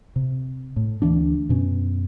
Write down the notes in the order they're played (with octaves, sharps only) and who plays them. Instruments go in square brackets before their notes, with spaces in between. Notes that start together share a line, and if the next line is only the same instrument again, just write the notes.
[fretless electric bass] C3
A2
D2 E3 A#3 D4
F#2 B2 C#4